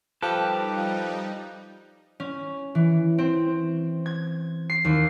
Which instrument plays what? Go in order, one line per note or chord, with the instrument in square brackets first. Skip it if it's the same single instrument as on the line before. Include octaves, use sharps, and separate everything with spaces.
[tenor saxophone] F3 [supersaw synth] G3 D#4 [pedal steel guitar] G4 B4 [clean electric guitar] A4
[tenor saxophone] F3
[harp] C#4
E3
C4
G#6
C7
D#2